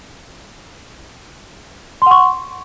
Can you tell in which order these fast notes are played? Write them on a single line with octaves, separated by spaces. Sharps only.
C6 F#5 C#6